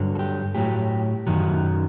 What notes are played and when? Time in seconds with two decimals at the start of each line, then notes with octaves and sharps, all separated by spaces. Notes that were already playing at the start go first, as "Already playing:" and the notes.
Already playing: G2 D3 F#3
0.15 A4
0.19 G4
0.55 A2 F#3 G4
1.27 F#2 D#3 F#3